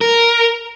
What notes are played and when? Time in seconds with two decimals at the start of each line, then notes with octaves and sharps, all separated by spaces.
0.01 A#4